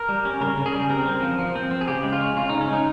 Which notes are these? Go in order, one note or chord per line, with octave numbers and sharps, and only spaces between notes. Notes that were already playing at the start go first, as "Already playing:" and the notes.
Already playing: A#4
G3
C#4
C#3 A#4
C#3
G#4
G3
C4 A#4
C4
F3
F3
C4
C4
G#4
C#3 G4
G#3
F4
C#4
C#3 F4
C#3 D#4
C#4
G#3 D#4